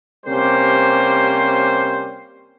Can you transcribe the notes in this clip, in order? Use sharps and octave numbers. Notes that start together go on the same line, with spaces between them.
C3 G3 A#3 C#4 C5